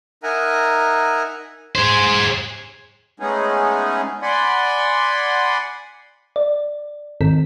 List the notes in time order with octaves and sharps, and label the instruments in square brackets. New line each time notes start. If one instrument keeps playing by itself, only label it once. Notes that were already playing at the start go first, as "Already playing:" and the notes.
[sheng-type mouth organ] D#4 A#4 E5 F#5 G#5 A#5
[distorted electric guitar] G#4 C5
[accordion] G#3 A3 B3 C#4 D#4 G#4
D5 F#5 G#5 B5 C6
[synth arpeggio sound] D5
G#2 D#3 C4 A4 B6